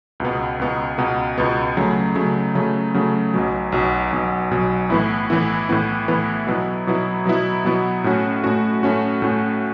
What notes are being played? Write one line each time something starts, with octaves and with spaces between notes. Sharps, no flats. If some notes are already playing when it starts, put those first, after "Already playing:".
C#2 B2 B3
C#2 B2 B3
C#2 B2 B3
C#2 B2 B3
C#3 F#3 A3
C#3 F#3 A3
C#3 F#3 A3
C#3 F#3 A3
B1 B2 F#3
B1 B2 F#3
B1 B2 F#3
B1 B2 F#3
A2 E3 B3 E4
A2 E3 B3 E4
A2 E3 B3 E4
A2 E3 B3 E4
B2 F#3 B3 E4
B2 F#3 B3 E4
B2 F#3 B3 E4
B2 F#3 B3 E4
A2 A3 C#4 F#4
A2 A3 C#4 F#4
A2 A3 C#4 F#4
A2 A3 C#4 F#4